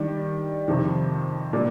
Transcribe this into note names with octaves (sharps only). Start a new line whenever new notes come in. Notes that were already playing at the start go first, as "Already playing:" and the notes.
Already playing: D#3 G3 D4 G4
F2 C3 D#3
A#2 G3 A#3 D4